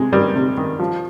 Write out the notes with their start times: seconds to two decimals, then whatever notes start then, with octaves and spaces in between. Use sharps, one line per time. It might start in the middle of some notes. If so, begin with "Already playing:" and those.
Already playing: C3 G#3
0.13 D#3 G3
0.36 C3
0.57 D#3
0.79 F3